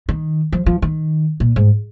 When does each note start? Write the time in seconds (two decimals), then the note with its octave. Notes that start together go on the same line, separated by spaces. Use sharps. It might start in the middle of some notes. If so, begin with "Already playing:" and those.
0.09 D#3
0.52 F3
0.66 F3
0.82 D#3
1.40 A#2
1.56 G#2